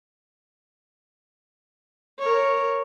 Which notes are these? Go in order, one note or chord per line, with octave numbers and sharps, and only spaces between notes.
A#4 C#5